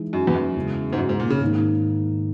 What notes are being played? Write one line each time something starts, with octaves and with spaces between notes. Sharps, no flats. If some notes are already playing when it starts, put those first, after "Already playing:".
Already playing: E3 G#3 D#4
F#2
E2
F#2
E2 C#3 G#3
G#2
F#2
G#2
A#2
C#3
G#2 D#3 A#3 D#4